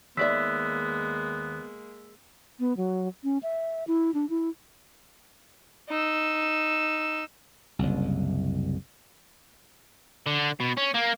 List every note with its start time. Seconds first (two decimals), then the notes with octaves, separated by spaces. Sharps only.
0.17 D#2 G#3 A#3 B3 D5 E5 E6 B6
2.59 B3
2.77 F#3
3.24 C#4
3.43 E5
3.87 E4
4.14 D4
4.30 E4
5.90 D#4 E6
7.79 F#1 C2
10.27 D3
10.60 B2
10.78 C#4
10.95 A#3